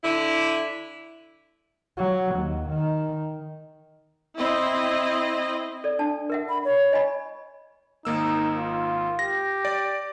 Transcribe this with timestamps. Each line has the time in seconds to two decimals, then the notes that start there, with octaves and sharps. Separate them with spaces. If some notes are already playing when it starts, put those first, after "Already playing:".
0.03 D3 E4
1.97 F#3
2.36 D#2
2.69 D#3
4.37 C4 E4 D#5
5.84 A4 D5
5.99 D4 A5
6.30 A#4 E5 F#5
6.49 B5
6.65 C#5
6.93 D#5 G#5 B5
8.05 G#1 A#3 D#4 E6
8.57 F4
9.19 G4 A#6
9.65 D5